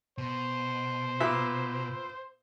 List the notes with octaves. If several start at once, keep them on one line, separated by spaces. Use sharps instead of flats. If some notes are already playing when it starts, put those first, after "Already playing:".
B2 C5
A#2 B3 E5